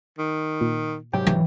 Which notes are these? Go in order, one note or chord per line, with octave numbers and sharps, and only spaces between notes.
D#3
A#2
G#2 C3 F#3 G4 G5
E3